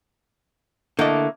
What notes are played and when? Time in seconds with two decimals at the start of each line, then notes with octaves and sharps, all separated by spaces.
0.99 D3 A3 A#3 E4 D#5